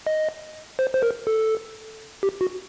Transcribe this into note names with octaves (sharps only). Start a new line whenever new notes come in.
D#5
C5
C5
A#4
A4
G4
F#4